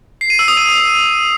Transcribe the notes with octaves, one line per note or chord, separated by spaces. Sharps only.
C7
D#7
E6
D#6
D#7